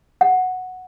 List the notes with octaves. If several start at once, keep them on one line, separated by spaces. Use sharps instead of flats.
F#5